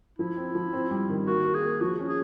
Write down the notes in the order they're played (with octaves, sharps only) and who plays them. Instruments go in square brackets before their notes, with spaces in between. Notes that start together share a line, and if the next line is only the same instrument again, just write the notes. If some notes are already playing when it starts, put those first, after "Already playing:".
[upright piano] F3 [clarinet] E4
[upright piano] C4
F3
C4
G3
D#3
[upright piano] A#3 [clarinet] F#4
[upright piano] A#3
[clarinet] G#4
[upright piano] A#3
[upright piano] F3 [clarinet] F#4
[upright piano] C#4
[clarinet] G#4